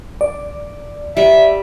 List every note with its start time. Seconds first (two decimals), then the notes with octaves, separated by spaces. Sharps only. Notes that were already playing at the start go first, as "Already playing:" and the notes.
0.21 D5
1.17 G3 E5